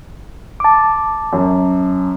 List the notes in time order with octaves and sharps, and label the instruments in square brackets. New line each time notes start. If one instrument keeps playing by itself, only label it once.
[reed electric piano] A5 D6
[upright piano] F#2